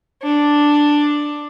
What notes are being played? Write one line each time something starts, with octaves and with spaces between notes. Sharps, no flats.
D4